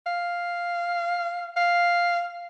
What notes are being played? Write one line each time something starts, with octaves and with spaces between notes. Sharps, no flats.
F5
F5